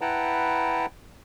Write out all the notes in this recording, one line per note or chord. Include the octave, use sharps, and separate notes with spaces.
E4 B4 F#5 G5 A5 A#5